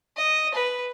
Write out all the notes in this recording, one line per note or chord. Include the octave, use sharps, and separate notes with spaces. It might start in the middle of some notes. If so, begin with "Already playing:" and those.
D#5
B4